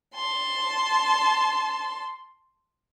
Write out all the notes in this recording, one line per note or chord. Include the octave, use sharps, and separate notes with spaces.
A5 C6